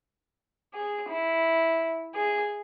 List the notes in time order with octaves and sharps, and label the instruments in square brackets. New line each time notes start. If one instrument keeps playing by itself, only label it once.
[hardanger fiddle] G#4
E4
G#4